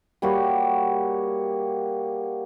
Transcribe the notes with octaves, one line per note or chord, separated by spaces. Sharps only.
G3 A#3 F#4 C#5